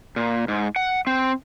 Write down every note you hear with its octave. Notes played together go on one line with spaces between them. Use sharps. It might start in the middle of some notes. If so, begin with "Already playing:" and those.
A#2
G#2
F#5
C4